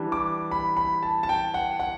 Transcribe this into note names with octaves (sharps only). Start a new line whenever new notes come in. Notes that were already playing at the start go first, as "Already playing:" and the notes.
Already playing: E3 G3 D4
D6
B5
B5
A5
A5
G5
F#5
F#5